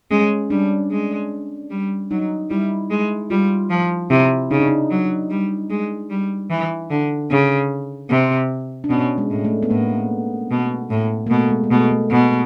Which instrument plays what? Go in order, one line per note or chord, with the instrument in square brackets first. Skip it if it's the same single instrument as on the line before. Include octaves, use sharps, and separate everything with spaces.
[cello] G#3 [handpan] C#4
[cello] G3 [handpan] D4
[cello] G#3
G3
[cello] F#3 [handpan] D#4
[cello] G3 [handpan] E4
[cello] G#3
[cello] G3 [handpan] F4
[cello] F3
[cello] C3 [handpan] E4
[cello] C#3 [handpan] D#4
[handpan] D4
D#4
[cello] F#3
G3
G#3
G3
E3
D3
C#3
C3
[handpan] D4
[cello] B2 [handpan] C#4
[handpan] G#3
[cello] A2
[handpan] A3
B3
[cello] A2 [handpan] A#3
[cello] B2
A2
[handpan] A#3
[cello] B2 [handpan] A3
[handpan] G#3
G#3
[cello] B2 [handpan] A3
[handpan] A3
[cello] B2 [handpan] B3